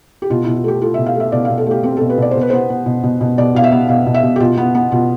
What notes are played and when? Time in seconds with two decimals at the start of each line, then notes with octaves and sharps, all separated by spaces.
0.22 G4
0.30 B2 F4
0.43 E4
0.47 B2
0.56 F4
0.64 A3 G4
0.81 A3 F4
0.94 B2 E5
1.06 F5
1.15 A3
1.20 E5
1.32 B2 D5
1.45 F5
1.50 B2
1.58 A4
1.66 A3 G4
1.83 C4 G4
1.97 A4
2.01 B2
2.09 B4
2.18 B2 D5
2.31 B2 C5
2.41 B4
2.50 B3 C5
2.70 B3
2.86 B2
3.03 B2
3.21 B2
3.38 B2 D5
3.55 B2 F5
3.64 E5
3.72 B3
3.89 B2 F5
4.06 B2
4.14 E5
4.23 B2
4.36 G4
4.40 B2 F4
4.57 B3
4.75 B3
4.92 B2 F4